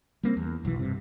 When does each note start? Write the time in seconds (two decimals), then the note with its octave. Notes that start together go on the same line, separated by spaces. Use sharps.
0.23 G3 A#3 C4
0.37 E2
0.63 F1 B1 A#2 E3
0.79 G2 C3